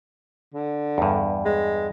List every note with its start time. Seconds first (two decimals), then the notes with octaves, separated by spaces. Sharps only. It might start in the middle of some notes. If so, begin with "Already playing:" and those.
0.54 D3
0.98 E2 G2
1.45 G#3